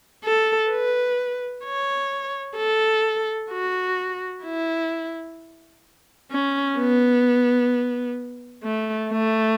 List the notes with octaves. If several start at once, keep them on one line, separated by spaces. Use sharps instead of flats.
A4
B4
C#5
A4
F#4
E4
C#4
B3
A3
A3